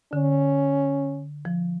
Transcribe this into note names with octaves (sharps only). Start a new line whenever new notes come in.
D3 C#4
F3